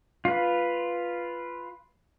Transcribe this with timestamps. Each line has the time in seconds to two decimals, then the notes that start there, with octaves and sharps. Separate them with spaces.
0.25 F4 B4